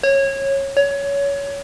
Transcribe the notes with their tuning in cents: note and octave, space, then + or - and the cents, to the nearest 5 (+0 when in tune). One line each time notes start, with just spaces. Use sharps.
C#5 -20
C#5 +20